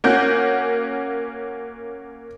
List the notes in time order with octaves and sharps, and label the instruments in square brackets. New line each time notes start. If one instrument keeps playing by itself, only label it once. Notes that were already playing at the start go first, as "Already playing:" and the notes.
[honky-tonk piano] A#3 C#4 F#4 G6